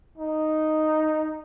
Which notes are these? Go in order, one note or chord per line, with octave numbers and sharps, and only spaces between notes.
D#4